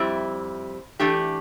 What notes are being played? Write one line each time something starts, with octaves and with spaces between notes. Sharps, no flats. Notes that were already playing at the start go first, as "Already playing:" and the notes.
Already playing: F2 G3 C4 E4
E3 A3 D4 G4